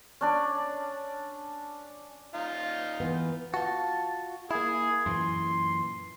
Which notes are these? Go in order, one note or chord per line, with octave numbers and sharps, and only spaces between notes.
C#4 D4 D5
D#4 F4
E3 B3
F4 F#4 A5
A#3 E4 G#4
F#2 A#2 E3 C6